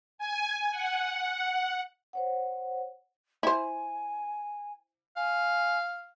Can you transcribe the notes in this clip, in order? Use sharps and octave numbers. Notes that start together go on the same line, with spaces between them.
G#5
F#5
C5 C#5 F#5
E4 C5 G#5
F5 G#5